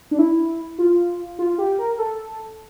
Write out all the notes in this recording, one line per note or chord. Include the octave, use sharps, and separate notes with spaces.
D4
E4
F4
F4
G4
A#4
A4